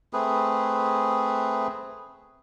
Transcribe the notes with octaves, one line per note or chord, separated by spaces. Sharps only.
A3 C4 G#4 B4